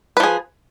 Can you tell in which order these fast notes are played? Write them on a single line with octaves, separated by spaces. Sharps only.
B4 F3 G#4